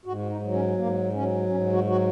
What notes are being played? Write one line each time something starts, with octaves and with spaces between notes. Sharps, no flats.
G#2 F#4
D#4
F#3
C#4
G#2 A#3
F#3 C#4
G#2 C#4
F#4
F#3 F#4